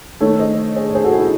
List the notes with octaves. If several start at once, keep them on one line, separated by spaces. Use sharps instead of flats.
D#3 A3 A4 C#5
C5 D#5
G#4 C5
C#5
G#4 C5
F#4 A4
E4 G#4
D#4